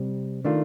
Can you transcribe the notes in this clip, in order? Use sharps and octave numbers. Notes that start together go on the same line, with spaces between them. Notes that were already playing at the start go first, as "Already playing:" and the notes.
Already playing: C3 G3
D#3 A3 D4 F4